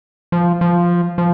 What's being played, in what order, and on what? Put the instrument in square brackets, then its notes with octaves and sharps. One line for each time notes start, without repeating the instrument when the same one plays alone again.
[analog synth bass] F3
F3
F3